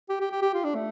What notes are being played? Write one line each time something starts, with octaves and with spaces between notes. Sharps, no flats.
G4
G4
G4
G4
F4
D4
A3